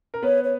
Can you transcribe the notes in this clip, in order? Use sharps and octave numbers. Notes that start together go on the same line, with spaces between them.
A#4
B3 B4 C#5
C#5